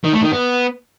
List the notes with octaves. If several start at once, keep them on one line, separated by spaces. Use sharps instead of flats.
D#3
A3
D#3
B3